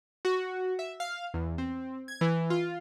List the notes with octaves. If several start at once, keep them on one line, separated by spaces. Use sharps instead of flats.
F#4
E5
F5
E2
C4
G#6
E3
F4